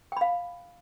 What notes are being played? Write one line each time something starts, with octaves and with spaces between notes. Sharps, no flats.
F5 G5 B5